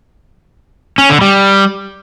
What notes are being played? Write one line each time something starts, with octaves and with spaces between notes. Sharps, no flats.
C#4
D3
G3